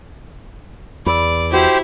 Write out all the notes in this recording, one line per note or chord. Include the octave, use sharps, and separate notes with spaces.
E2 D5 B5 E6
E4 F#4 G4 C5